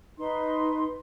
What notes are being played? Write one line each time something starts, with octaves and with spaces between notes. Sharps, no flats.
D#4 B4 C6